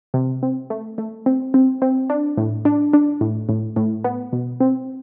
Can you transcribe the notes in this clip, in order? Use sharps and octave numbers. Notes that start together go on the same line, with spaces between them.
C3
C4
A3
A3
C4
C4
C4
D4
A2
D4
D4
A2
A2
A2
B3
B2
C4